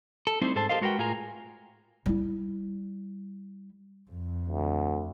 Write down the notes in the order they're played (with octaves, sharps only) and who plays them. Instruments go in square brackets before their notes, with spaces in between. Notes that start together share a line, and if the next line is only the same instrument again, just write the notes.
[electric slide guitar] A4
G3 A3 C4 D#4 E4 C5
G#2 G#4 A4 C5 A5
G4 A4 A#4 C5 D#5 F5
G#3 F#4 A#4 B4 G5
A2 F4 G#4 A#4 G#5 A#5
[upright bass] G3 E4
[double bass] F2
[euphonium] D2